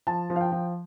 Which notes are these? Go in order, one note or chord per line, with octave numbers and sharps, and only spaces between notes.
F3 A5
F3
F5
G5
F3